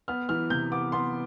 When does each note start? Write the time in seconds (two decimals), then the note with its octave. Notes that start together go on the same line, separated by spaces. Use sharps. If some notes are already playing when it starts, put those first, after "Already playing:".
0.08 B3 F6
0.29 E3 F6
0.50 C3 G6
0.72 B3 D6
0.92 B3 C6